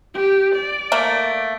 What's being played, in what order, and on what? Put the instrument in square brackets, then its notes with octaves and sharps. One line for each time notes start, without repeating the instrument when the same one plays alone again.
[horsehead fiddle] G4
D5
[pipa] A3 A#3